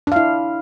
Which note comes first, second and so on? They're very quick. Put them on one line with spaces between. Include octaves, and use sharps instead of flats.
D4 F5 E4